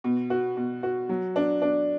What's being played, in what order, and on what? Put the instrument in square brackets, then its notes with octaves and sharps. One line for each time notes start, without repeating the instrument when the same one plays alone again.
[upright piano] B2
F#4
B2
F#4
F#3
D4
D4